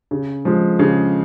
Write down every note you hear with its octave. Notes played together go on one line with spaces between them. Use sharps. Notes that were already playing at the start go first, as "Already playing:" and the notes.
C#3
F3 G#3
C#3